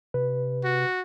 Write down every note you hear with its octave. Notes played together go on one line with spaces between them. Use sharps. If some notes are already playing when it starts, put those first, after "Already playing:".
C3 B4
F#4